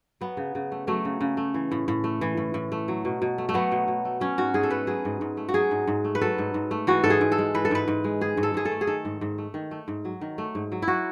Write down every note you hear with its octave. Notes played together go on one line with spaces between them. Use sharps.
F#3 B3
C#3
C#3
A3
F#3 A3
C#3
C#3
A3
E3
A2
A2
A3
E3
A2
A2
A3
F#3
B2
B2
A3
A3
F#3 B3
B2
B2
A3
F#3 C#4
G#2 F#4
G#2 G#4
A4
A3 B4
F#3 G#4
G#2
G#2
A3
F#4
F#3 G#4
G#2
G#2
A3
B4
F#3 A4
G#2
G#2
A3
E3 F#4
G#2 A4
G#4
G#2
A4
G#3
E3 B4
A4
G#2 B4
G#2
G#3
D#3 G#4
G#2
A4
G#2 G#4
A4
A3
G#4
D#3 A4
G#2
G#2
A3
D#3
A3
G#2
F#3
D#3
A3
G#2
F#3
E4
F#3 F#4